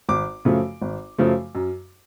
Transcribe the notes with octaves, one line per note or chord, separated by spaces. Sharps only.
G#1 D6
F#2 C#3 F3 A3
G#1
F#2 C#3 F3 A3
F#2